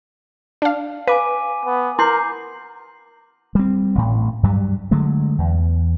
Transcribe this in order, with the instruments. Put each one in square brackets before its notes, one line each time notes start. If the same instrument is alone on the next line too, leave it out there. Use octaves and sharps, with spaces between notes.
[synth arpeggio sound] D4 F5
[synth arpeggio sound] B4 [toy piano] F5 [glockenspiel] G#5 D6 D#7
[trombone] B3
[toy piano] E4 C6 [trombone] A#4 [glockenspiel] D6 G6 C7
[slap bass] G3 C4
A1 A2
G2 F#3 G3
D3 F#3 G#3 A3
E2